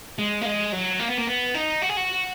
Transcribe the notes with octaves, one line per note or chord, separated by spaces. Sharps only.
G#3
A#3
G#3
F#3
A#3
B3
A#3
B3
D#4
F#4
G#4
F#4